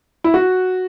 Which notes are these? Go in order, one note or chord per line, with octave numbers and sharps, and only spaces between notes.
E4
F#4